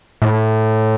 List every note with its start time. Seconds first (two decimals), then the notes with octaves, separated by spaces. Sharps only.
0.22 A2